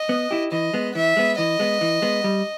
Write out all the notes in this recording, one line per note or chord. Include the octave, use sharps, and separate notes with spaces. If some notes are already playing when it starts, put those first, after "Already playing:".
Already playing: D#5
B3
E4 G4
E3 D#5
G#3 B3
E3 E5
G#3 B3
E3 D#5
G#3 B3
E3
G#3 B3
G3